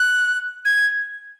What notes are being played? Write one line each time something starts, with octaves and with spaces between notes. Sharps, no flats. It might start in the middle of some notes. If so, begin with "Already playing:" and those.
Already playing: F#6
G#6